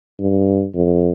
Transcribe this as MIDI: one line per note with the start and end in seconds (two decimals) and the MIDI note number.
0.19 0.66 43
0.74 1.11 41